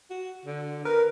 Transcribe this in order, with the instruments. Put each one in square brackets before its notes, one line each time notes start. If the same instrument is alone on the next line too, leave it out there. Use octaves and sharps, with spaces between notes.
[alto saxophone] F#4
D3
[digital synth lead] A#4 [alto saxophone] B4